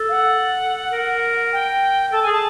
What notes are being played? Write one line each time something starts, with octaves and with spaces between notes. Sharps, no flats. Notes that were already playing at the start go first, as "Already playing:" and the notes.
Already playing: A4
F5
F#5
A#4
G5
A4 A5
G#4 G#5
A5